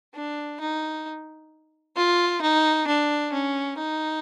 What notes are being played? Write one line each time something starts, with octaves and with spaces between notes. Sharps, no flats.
D4
D#4
F4
D#4
D4
C#4
D#4